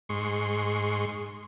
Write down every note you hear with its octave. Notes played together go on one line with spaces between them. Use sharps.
G#2 C6 C#6